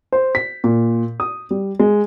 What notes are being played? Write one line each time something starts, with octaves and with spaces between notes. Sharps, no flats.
C5
B6
A#2
D#6
G3
G#3